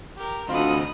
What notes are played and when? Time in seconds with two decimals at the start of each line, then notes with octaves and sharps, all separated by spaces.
0.17 G4 A#4
0.49 D2 C4 D#4 F4 B5 D#6